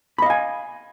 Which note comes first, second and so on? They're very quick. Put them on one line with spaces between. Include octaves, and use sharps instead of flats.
B5 D#5 F5 G#5